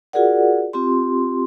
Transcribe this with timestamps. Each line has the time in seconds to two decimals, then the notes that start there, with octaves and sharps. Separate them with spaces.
0.13 F4 F#4 G#4 A#4 D5 F#5
0.73 C4 F4 G4 C6